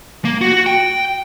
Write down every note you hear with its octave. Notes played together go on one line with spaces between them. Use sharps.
A#3
F#4
G5